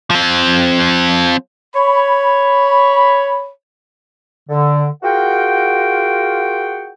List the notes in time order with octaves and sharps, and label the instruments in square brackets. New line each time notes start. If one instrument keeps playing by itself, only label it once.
[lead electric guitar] F3 C4
[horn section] C#5 B5
[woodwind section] D3
F4 F#4 G#4 A#4 F#5 G5